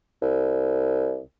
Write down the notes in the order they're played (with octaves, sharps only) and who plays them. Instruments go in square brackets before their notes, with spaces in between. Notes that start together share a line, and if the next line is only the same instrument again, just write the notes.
[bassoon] C2